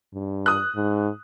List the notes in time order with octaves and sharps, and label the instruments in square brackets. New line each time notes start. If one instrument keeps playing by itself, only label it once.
[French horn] G2
[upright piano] D#6 F#6
[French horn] G#2